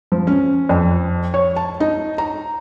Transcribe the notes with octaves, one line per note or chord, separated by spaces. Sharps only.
F3
C#4
F2
C#5
A5
D#4
A#5